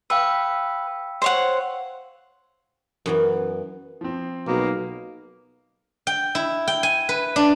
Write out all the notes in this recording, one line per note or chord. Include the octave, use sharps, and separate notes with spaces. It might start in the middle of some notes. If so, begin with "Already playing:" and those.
B4 F5 G5 E6
C5 C#5 F#5
F#2 E3 B3
F3 C4
B1 B2 A#3
G5
E4
G5
G#5
B4
D4